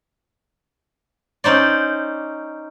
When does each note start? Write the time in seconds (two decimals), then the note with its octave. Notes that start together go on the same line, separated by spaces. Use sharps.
1.44 C#4 D#4 C5 D5